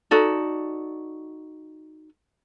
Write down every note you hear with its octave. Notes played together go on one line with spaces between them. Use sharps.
D#4 F#4 A4 D5